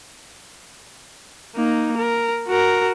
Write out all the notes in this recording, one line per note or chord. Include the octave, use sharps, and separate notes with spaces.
A#3 D#4
A#4
F#4 A#4